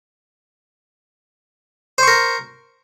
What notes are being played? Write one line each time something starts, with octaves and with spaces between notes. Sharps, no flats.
A#4 C5 C#6